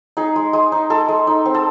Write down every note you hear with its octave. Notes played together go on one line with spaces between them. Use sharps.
D#4 G#4
G#3
G#3
D#4
G#3 A4
G#3
D#4
C4
A4